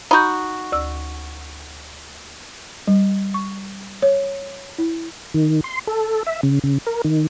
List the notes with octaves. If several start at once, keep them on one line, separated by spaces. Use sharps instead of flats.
D#4 F#4 B5 G6
D2 E6
G3
C#6
C#5
E4
D#3
C6
A4
E5
C#3
C#3
A#4
D#3